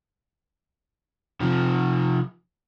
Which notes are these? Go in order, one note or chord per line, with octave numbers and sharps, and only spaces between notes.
C3 F3